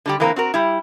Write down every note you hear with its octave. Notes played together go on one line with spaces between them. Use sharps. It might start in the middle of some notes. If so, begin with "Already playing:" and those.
D3 G3 G4
E3 G#3 A#3 C4 D4 A#4
C4 F#4 A#4
G3 E4